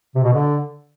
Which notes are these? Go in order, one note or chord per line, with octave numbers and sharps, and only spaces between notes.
C3
B2
D3